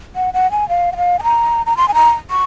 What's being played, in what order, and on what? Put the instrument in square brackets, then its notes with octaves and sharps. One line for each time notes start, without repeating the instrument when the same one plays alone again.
[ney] F#5
F#5
G#5
F5
F#5
F5
G#5
A#5
A#5
C6
G#5
A#5
C#6